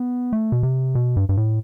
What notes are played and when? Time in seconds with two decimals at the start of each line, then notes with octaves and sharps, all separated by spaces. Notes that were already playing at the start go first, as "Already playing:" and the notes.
Already playing: B3
0.33 A3
0.52 B2
0.63 C3
0.95 B2
1.17 G2
1.29 G2
1.37 A2